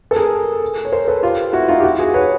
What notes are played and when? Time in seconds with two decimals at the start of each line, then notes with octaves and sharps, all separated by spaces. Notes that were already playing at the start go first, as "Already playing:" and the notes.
0.11 A4
0.16 G#4 A#4
0.85 C#5
0.92 A#4 C5
1.08 A4 B4
1.23 F4 G4
1.53 E4 F#4
1.68 D#4 F4
1.80 G4
1.83 E4 F#4
1.99 F#4 G#4
2.14 B4 C#5